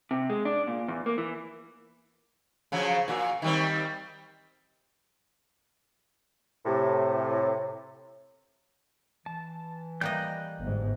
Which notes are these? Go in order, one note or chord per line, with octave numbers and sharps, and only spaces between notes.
C3
G#3
D4
A#2
E2
A#3
E3
C#3 F3 F#3
A#2 F#4
D#3 G3 C4
A2 C3
E3 A5
G3 A#3 D#5 F#6 G6
G1 G#2